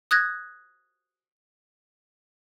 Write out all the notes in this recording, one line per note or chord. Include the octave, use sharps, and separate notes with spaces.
D#6 F#6 G#6 A#6